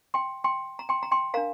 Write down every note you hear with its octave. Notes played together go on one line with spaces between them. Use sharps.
G5 C6
G5 C6
A#5
G5 C6
A#5
G5 C6
D4 A#4 F5 A#5